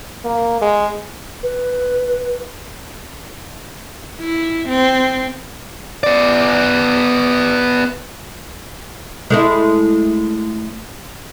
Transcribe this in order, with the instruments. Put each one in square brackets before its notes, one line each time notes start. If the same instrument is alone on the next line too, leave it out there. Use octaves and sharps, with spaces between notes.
[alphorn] A#3
G#3
[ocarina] B4
[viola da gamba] E4
C4
[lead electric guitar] B3 D5
[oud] G#3 A3 E4